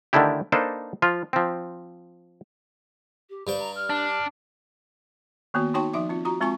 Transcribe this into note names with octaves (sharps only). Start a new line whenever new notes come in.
D3 D#3 A3 D4 E4 G4
A#3 D4 D#4 A4 B4 C5
F3 F4
F3 C4
G4
G2 G3 C5 G5
A#5
F6
D4
D#3 A#3 B3 F#4
D#4 F#4 C#5 G5 A5 C#6
F3 D#4 E5 D6
C4 F4
F4 F#4 A#5
G#3 C4 F4 G#5 C#6